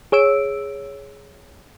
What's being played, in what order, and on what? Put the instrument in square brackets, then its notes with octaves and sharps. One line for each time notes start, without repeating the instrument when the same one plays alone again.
[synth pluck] G#4 C#5 E6 D7